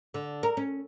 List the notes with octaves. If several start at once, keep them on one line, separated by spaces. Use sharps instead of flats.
D3
A#4
C#4